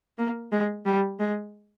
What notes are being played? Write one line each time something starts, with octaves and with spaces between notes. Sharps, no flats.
A#3
G#3
G3
G#3